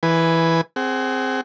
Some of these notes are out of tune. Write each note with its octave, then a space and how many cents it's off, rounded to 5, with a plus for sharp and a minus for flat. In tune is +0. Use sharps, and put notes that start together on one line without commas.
E3 +0 B4 +0 G#5 +0
C4 +0 G#4 +0 F#5 +40